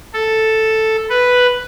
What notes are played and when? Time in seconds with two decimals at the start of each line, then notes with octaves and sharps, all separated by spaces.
0.14 A4
1.09 B4